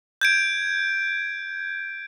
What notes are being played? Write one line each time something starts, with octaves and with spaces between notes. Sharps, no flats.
G6 G#6 D7